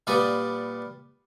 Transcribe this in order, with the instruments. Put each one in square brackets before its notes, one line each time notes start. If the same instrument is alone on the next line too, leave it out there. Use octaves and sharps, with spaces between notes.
[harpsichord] A#2 G3 B4 D5 F#5 D#6